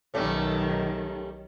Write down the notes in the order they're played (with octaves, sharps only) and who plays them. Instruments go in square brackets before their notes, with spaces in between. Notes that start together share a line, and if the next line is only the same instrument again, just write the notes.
[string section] B1 D#3 [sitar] G3 A3 C#4